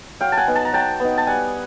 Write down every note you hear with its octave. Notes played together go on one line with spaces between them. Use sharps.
F#3 F5 G5
A5
F#5 G#5
B3 D#4
A5
A#5
F#3 G5 A5
B3 D#4
A5
G3 F#5 G#5